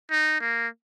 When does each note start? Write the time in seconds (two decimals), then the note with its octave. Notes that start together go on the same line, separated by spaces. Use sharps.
0.10 D#4
0.40 A#3